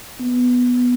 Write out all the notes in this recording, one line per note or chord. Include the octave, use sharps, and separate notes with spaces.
B3